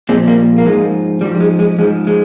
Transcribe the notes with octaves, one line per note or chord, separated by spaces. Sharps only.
A#2 F3 G#3 C4
G3 A#3
A#3
G#2 F3 G#3
G#2 F3 G3
G3
G#3
G#3
G#2 F3 G#3
G#3